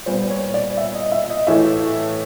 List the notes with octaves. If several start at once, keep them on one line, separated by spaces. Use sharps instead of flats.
A#2 G3 B3 C5
C#5
D5
E5
D#5
E5
D#5
A2 E3 A3 E5